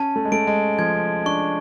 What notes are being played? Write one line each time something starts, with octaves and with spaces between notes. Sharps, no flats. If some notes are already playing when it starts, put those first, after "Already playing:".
Already playing: C#4 A5
A3
G#3
A3 D7
G#3
F3 G#6
D4 C#6